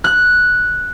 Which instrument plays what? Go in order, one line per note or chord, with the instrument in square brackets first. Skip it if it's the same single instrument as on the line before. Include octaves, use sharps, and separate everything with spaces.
[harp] F#6